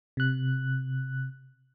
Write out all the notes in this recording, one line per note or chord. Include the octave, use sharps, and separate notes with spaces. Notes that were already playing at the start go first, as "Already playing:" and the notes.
C3 F#6